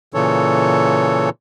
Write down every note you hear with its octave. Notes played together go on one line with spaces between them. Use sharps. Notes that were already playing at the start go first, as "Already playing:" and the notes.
A#2 C#3 E3 A4 C#5